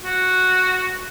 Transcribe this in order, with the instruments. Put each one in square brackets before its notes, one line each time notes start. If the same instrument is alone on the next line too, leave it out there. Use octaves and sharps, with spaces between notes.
[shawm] F#4